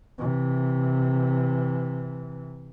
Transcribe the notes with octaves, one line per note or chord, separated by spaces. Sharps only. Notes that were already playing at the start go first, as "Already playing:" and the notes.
C3 E3